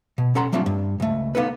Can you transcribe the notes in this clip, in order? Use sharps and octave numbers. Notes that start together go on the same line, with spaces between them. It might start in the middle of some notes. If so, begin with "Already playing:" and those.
B2
C#4 A4 F#5 A#5 C6
F#3 G3 A3 C4 D4 F4
G2
C#2 A3
A#3 B3 D#4 A4 B4